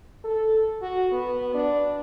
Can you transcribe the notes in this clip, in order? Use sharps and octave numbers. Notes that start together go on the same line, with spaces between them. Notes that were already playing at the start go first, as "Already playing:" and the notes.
A4
F#4
B3
D4